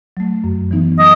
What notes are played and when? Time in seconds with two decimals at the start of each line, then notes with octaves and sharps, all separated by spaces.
0.17 F#3 A3
0.44 F#2
0.71 E3 B3 D#4
0.99 F#3 D#5